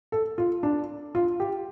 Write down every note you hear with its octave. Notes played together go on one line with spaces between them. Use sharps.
A4
F4
D4
F4
G4